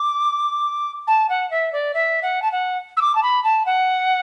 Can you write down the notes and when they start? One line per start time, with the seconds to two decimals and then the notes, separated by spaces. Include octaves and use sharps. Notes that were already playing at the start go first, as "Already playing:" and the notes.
Already playing: D6
1.07 A5
1.29 F#5
1.51 E5
1.73 D5
1.94 E5
2.22 F#5
2.42 A5
2.52 F#5
2.97 E6
3.01 D6
3.15 A5
3.23 B5
3.44 A5
3.66 F#5